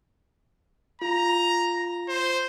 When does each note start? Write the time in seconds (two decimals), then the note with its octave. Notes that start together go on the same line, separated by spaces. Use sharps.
1.02 F4 A#5
2.08 C5